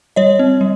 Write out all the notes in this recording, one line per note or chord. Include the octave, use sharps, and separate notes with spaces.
G3 C#5 D#5
C4
G3